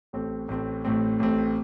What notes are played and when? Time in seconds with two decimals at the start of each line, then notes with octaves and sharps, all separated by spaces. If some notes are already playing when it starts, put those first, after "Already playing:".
0.13 A1 A2 A3 C4
0.48 A1 A2 A3 C4
0.85 A1 A2 A3 C4
1.20 A1 A2 A3 C4